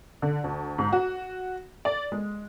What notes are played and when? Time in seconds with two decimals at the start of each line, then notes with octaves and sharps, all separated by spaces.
0.22 D3
0.44 D2
0.78 G#2
0.93 F#4
1.85 D5
2.12 G#3